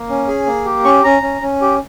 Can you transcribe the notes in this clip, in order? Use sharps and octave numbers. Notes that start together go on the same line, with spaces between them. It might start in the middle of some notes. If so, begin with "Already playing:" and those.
Already playing: A#3
C#4
G#4
A#3
G4
C#4 C#6
C#4 A#5
C#4
C#4
G4